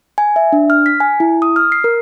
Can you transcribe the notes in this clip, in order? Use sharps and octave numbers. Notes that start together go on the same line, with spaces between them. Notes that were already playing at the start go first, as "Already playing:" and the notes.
G#5
E5
D4
F6
B6
G#5
E4
D#6
F6
C7
A#4